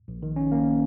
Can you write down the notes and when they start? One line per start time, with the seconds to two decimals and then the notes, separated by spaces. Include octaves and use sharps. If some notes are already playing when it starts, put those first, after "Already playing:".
0.08 A#1
0.23 D#3
0.36 C#4
0.52 A#3